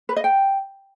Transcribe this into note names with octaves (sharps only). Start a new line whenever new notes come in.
B4
D#5
G5